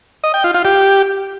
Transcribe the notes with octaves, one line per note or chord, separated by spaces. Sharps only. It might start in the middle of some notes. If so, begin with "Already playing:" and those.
D#5
G5
F4
F4
G4